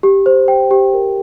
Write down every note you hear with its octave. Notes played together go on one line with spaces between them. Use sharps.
G4
C5
G5
G4
A#4